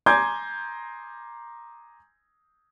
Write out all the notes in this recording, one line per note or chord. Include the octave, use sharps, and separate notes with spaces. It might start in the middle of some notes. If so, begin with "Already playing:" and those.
G#5 A#5 C6 D6 G6 G#6